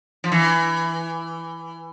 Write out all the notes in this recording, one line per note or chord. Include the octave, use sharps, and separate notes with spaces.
F3
E3